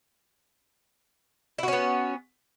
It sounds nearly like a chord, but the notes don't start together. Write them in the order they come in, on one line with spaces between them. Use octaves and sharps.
E4 F#4 C#4 B3